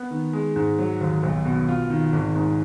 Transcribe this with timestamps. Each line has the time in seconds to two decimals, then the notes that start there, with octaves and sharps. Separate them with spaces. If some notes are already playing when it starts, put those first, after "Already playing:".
Already playing: B3
0.11 D#3
0.33 G#3
0.56 G#2
0.79 F#3
1.01 D#2
1.23 B1
1.45 B2
1.69 F4
1.90 D#3
2.13 G#1
2.36 G#2